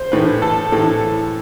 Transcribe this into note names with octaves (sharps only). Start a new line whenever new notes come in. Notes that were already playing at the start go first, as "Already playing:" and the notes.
Already playing: C5
A2 E3 B4
A4
A2 E3 A4